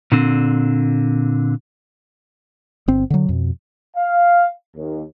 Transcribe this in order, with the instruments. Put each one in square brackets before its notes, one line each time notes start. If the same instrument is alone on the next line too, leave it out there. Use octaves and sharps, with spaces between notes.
[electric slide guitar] A#2 D3 C4
[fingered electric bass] G1 C4
D3 F#3
F2 B2
[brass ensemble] F5
D#2